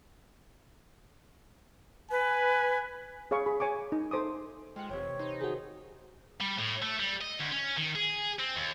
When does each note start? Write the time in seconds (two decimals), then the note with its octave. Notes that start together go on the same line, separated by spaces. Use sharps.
2.11 B4 G#5
3.31 G#4 C#5 F5 B5 C#6
3.46 G#4 B5
3.60 C#5 G#5 C#6 D6
3.92 D#4
4.11 A4 C5 D6 D#6
4.76 G#3 F4 F#5 G5
4.90 F1 C3 E3 C#5 G5
5.19 D#4 C5
5.41 D#3 F#4 G#4
6.40 G3
6.58 A2
6.82 A3
7.00 G3
7.21 D#5
7.40 D2
7.52 C#4
7.78 D#3
7.96 G#4
8.39 C4
8.56 D#2